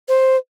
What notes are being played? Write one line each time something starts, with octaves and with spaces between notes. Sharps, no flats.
C5